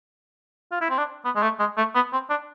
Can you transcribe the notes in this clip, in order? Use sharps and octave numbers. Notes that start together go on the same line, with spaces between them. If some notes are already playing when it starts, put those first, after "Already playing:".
F4
E4
C4
D4
B3
G#3
A3
G#3
A3
B3
C4
D4